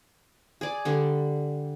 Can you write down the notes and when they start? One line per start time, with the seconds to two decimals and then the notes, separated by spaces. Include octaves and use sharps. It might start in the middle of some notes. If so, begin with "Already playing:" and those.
0.61 G#4 D5
0.85 D3 G3